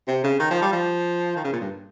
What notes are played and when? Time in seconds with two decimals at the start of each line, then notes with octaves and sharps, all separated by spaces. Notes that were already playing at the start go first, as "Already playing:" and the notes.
0.08 C3
0.24 C#3
0.40 D#3
0.50 F3
0.62 G3
0.72 F3
1.36 D#3
1.44 C#3
1.53 A#2
1.61 G2